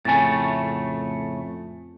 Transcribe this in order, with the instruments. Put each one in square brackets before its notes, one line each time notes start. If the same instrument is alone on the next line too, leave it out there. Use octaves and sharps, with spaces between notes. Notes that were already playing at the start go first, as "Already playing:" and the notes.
[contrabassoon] F2 [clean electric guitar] A2 C#3 A3 [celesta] G#5 A6